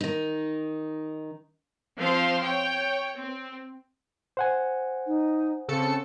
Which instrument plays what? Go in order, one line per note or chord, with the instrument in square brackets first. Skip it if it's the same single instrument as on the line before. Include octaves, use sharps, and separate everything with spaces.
[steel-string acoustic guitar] D#3 D#4
[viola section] F3 C4 C5 F5 C6
C#5 G5
C4
[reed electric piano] C5 F#5 G#5
[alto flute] D#4
[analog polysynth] C#3 A4 C#7 [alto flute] C4